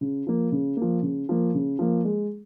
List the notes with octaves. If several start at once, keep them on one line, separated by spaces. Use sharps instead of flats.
C#3
F3 A#3
C#3
F3 A#3
C#3
F3 A#3
C#3
F3 A#3
G#3